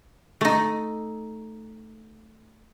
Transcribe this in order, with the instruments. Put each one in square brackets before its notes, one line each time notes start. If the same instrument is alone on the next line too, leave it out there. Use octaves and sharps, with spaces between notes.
[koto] A3 D#4